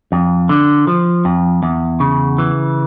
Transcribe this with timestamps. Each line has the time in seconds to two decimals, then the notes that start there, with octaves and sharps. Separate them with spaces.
0.12 F2
0.49 D3
0.87 F3
1.25 F2
1.63 E2
2.00 C#3
2.38 E3